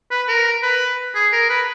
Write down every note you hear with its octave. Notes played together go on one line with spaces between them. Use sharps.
B4
A#4
B4
G#4
A#4
B4